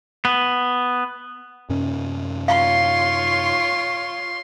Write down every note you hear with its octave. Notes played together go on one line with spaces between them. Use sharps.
B3
F#2 C3 C#4
F4 C#5 F5 C6